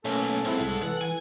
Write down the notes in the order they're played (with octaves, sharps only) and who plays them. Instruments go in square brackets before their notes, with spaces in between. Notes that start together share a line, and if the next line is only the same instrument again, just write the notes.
[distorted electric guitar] B1 [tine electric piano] A3 A#3 C#4 [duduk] A4
[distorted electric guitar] G#2 [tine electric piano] C4 E4
[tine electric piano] C2
[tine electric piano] E3 [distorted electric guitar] F#5
[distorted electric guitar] G#5